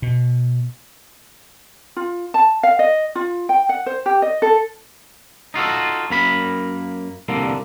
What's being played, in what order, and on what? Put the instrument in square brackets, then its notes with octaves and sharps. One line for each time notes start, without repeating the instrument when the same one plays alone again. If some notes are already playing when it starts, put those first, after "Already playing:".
[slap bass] B2
[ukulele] F4
A5
F5
D#5
F4
G5
F#5
C5
G4
D#5
A4
[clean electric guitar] D#4 F4 F#4 A4
F#2 A#3 B5
C2 D3 A#3